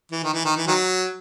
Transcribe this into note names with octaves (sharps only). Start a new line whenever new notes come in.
E3
D#3
E3
D#3
E3
D#3 F#3